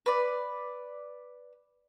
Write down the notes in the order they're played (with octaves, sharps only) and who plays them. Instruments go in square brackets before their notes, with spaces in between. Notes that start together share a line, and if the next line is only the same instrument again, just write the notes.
[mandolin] B4 D5